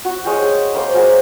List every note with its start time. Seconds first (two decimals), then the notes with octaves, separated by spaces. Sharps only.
0.05 F#4
0.25 G#3 C#5 F5 G5
0.42 G#4
0.75 A#3 C5 G5 D6
0.94 F#3 G#3 F5 D6